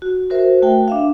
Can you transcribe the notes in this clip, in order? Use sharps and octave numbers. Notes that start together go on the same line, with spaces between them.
F#4
F#4 A#4 C5 E5
A3 F#4 G5
D4 E5 F5